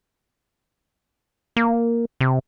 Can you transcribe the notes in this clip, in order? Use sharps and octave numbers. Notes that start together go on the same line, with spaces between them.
A#3
C3